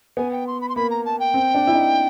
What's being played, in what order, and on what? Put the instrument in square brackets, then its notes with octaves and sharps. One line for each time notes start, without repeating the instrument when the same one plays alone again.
[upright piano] B3 [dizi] G#5
[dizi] G5
C6
B5
C6
[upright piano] A#3 [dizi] B5
[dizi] A#5
A5
G5
[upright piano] C4
D4
E4
D#4